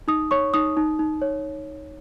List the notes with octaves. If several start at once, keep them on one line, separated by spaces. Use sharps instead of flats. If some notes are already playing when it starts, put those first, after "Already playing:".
D#4 D#6
C#5 C#6
D#4 D#6
D#4
D#4
C#5